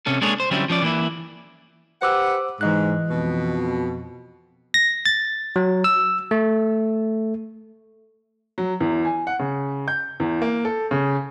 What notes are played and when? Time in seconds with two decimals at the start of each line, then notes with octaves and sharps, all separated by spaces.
0.06 C3 C#4 A4
0.21 G#3 A#3 D4 G#4 A4 C#5
0.40 C5
0.51 D3 F#3 G3 C4 C#4 E4
0.69 F3 C#4 D5
0.82 E3 A#3 E4
2.02 G4 B4 C5 F#5 D6 E6
2.61 G#2 E3 D#5 F#6
3.09 F2 B2
4.74 A#6
5.06 A6
5.56 F#3
5.84 E6
6.31 A3
8.58 F#3
8.80 E2
9.05 G#5
9.27 F#5
9.39 C#3
9.88 G6
10.20 E2
10.42 A#3
10.65 A4
10.91 C#3